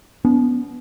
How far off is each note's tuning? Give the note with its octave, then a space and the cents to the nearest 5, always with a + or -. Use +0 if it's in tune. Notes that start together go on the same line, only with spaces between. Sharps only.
B3 +0 D4 -45